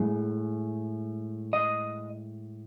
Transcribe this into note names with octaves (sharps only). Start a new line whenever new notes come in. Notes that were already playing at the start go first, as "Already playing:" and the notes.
Already playing: A2 G#3
D#5